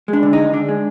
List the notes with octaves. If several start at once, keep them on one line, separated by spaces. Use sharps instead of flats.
G#3
D4
D3
G#3 D#4
D3 D4
G#3